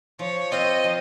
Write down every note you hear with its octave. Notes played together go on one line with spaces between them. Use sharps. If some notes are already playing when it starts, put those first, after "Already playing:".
F3 C#5
C4 F4 C5 D#5
F3